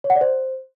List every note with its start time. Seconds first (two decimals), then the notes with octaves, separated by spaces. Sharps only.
0.04 C#5
0.10 F#5
0.16 D5
0.21 C5